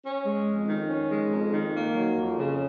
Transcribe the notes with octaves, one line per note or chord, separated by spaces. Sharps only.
C#4
G#3
F2
D#3
C#4
G#3
F2
D#3
A#3
F#3
F2
C#3